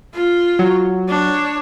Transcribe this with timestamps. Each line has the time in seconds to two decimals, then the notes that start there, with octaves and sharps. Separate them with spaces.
0.14 F4
0.59 F#3
1.08 D4 C#5